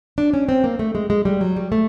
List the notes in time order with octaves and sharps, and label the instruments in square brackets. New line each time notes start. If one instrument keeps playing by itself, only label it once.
[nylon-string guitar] D4
C#4
C4
A#3
A3
G#3
G#3
G3
F#3
G3
A3